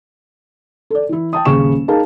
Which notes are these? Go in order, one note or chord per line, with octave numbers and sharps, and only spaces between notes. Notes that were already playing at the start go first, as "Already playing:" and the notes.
A4 D5
E3 E4
G5 A5 D#6
D#1 C#3 C#6 E7
D#4 G#4 A#4 F5 A5